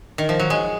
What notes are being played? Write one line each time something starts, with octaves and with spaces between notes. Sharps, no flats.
D#3
F3
F#3
G#3